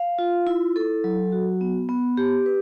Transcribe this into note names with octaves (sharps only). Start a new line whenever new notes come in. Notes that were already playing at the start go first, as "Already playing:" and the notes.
Already playing: F5
F4
E4
A4
F#3
F#4
B3
B3
G4
B4